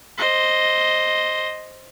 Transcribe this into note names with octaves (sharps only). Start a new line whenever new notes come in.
C5 D#5